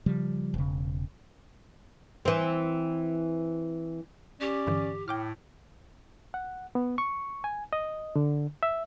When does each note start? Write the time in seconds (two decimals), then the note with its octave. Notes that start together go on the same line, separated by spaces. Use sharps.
0.06 C#3 F3 G3
0.54 E1 C#3
2.25 E3 C4
4.40 C#4 G4 D5
4.67 G2 D3 E3
5.08 A2 G5 D6 F6
6.34 F#5
6.75 B3
6.98 C#6
7.44 G#5
7.73 D#5
8.16 D3
8.63 E5